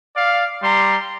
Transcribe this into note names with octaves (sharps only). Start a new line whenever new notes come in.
D5 F5
G3 A#5 C6